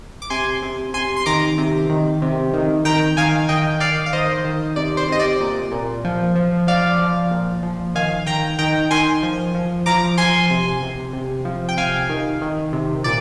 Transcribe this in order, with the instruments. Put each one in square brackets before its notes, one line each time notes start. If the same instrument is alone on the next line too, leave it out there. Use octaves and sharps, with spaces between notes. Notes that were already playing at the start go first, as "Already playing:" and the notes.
[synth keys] D6
C3 G#5 C6
C3
C3 G#5 C6
C6
D#3 A#5 D6
C3
D#3
C3
D#3
D#3 G5 A#5
D#3 F5 G#5
D#3 D#5 G5
D#3 D5 F5
F5
D#3 C5 D#5
D#3
C3 D5
C5
C3 D#5
D5
A#2
A#2
F3
F3
F3 D5 F5
F3
A#2
F3
D#3 F5 G#5
D#3 G5 A#5
D#3 G5 A#5
D#3 G#5 C6
F3
F3
F3 A#5 D6
F3 G#5 C6
C3
C3
C3
F3
G5
C3 F5 G#5
D#3
D#3
C3
A#2 D5